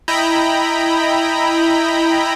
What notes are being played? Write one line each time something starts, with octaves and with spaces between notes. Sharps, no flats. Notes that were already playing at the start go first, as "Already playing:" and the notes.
E4 D#5 G5 A#5 B5